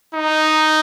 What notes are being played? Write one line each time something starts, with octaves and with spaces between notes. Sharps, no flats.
D#4